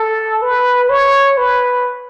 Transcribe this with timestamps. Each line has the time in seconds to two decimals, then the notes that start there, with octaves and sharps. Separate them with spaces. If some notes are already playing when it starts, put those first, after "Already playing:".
Already playing: A4
0.42 B4
0.90 C#5
1.37 B4